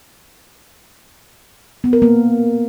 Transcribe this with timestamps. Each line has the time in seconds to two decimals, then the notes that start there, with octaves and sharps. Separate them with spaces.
1.84 B3
1.93 A#4
2.02 A#3